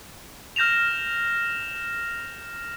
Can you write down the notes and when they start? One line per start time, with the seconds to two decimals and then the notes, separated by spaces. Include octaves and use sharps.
0.56 F6 G6 A#6 E7 F7